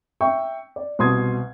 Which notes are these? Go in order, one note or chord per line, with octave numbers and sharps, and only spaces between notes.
E5 G5 C#6
D5
C2 B2 C6 D#6 G#6